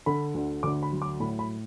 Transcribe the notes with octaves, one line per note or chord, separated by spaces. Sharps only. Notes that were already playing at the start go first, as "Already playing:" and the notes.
D3 B5
D2
D2 D6
B5
F#3
D6
A2 B5
B5